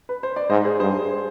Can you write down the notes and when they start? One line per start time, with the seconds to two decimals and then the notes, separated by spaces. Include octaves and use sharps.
0.09 B4
0.23 C5
0.36 D5
0.50 G#2 C5 D#5
0.65 G#4 C5
0.79 G2 G#4 C5